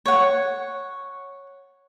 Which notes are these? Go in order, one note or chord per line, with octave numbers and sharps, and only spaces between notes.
C#5 F#5